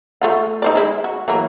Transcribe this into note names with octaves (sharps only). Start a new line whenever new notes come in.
A3 F4 F#5
D#4 C5 D5
G#3 E4
F#4
E3 F#3 A#3